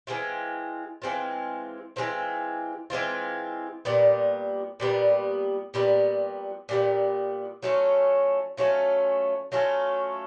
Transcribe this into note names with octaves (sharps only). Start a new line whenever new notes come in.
E3 G#3 C4 F4
E3 G#3 C4 F4
E3 G#3 C4 F4
E3 G#3 C4 F4
A#2 G3 B3
A#2 G3 B3
A#2 G3 B3
A#2 G3 B3
F#3 A3 C#4 F4
F#3 A3 C#4 F4
F#3 A3 C#4 F4